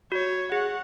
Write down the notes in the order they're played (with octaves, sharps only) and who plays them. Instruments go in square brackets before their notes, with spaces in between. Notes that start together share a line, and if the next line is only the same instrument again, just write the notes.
[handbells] F#4 [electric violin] C#5
[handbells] G#4 [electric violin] F#5